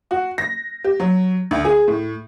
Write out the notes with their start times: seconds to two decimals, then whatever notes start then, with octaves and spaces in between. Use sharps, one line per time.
0.11 F#4
0.38 A#6
0.84 G4
1.00 F#3
1.51 D2
1.65 G#4
1.88 A2